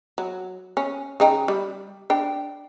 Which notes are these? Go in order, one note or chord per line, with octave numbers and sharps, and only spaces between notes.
F#3
C#4
C#3 D#4 G5
G3
D4 G5